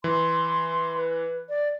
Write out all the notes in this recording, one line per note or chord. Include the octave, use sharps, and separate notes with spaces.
E3 C6
B4
D5